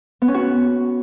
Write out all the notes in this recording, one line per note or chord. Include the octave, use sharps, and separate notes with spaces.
B3
C#4
F#4